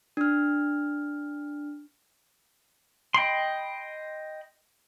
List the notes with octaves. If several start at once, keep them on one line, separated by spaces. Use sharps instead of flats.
D4 F6
D#5 G5 B5 C6